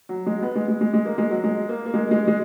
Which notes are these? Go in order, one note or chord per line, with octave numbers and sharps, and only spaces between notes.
F#3
G#3
B3
G#3
G#3
G#3
G#3
A#3
G#3
F#3
G#3
A#3
A#3
G#3
G#3
G#3